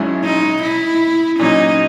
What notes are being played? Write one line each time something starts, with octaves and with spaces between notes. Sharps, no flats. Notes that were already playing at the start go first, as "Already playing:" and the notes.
Already playing: G#1 G#2 F#3 C#4 E4
D#4
E4
A#2 F#3 C#4 D#4